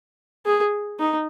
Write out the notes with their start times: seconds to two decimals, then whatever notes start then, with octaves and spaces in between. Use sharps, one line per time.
0.46 G#4
0.99 D#4